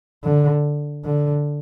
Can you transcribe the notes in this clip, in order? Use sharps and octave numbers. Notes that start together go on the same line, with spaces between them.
D3
D3